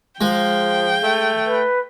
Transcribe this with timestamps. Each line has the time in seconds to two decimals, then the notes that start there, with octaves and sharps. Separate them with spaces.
0.21 F3 G#3 F5 G5
1.03 A3
1.46 B4